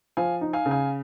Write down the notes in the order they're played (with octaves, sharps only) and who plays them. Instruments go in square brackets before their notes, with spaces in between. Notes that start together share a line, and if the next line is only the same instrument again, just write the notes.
[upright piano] F3 [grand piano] F5 G#5
[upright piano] D#4
[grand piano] F5 G#5
[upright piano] C#3
[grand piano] F5 G#5